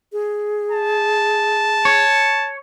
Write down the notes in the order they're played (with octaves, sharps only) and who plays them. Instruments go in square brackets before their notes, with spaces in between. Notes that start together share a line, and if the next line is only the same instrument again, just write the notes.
[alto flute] G#4
[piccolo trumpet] A5
[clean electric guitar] C#5